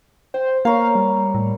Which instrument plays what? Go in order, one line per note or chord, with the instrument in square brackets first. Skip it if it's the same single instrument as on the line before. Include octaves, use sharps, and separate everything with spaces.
[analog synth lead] C5 [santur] G5
[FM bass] A#3 [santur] A#4 C#5 [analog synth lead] F5
[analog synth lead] G3
[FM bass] A2